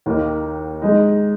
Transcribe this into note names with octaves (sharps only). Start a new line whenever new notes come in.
D#2 D#3 A#3 D#4
G#3 D#4